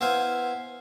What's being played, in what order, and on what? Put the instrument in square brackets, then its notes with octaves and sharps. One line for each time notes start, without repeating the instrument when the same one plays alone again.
[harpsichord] B3 E4 C5 F5 G#5